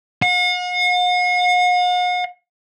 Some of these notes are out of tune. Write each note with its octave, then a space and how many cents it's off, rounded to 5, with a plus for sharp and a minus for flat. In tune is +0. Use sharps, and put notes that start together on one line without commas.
F#5 -45